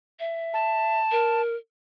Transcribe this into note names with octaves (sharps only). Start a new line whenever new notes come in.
E5
A5
A#4